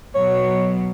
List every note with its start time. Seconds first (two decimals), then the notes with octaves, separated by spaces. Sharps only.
0.15 B2 F#3 C#5